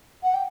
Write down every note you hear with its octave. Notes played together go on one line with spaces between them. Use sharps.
F#5
G5